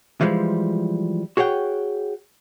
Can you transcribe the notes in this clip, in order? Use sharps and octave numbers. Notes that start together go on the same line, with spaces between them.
E3 F3 G3 G#3
F#4 G#4 C#5 F#5 G5